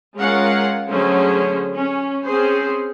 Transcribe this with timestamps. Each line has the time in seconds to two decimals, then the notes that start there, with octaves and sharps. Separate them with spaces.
0.17 G#3 C#4 F4 A#4 F5 F#5
0.86 D3 F#3 A3 C#4 G#4 C5
1.74 C#4
2.23 C4 C#4 G#4 C5